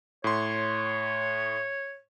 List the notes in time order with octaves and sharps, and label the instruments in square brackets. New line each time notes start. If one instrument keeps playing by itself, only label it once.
[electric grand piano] A2 C6 [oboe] C#5